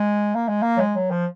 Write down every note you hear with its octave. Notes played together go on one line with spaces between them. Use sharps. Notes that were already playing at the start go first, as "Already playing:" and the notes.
Already playing: G#3
A#3
G#3
A#3
F#3
G#3
F#3
F3